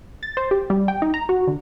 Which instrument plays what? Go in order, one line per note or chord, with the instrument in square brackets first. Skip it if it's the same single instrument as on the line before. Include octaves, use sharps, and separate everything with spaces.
[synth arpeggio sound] A6
C5
G4
G3
G5
D#4
A#5
F#4
D3